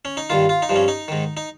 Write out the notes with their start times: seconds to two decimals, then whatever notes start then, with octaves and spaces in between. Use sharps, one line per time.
0.05 C#4
0.17 D#4
0.30 G2 D#3 F4
0.49 F4
0.62 D#4
0.69 G2 F3
0.76 C#4
0.88 D#4
1.08 G#2 D#3
1.37 D#4